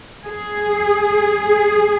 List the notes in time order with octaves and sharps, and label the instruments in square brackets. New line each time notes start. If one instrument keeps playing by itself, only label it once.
[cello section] G#4